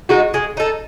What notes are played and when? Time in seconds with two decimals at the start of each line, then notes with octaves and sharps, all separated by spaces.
0.09 G#3 D#4 F#4
0.34 G#3
0.57 D#4 A4